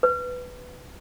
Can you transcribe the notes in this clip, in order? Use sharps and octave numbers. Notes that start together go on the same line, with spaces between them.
B4